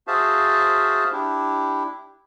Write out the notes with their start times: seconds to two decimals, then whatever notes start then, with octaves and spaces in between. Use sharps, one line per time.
0.07 F#4 G#4 C5 E5 F5 A5
1.12 D4 E4 G4